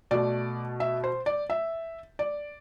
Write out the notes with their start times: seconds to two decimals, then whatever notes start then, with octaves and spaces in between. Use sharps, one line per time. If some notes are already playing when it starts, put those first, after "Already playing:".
0.11 B2 A3 D5
0.80 E5
1.04 C5
1.26 D5
1.50 E5
2.19 D5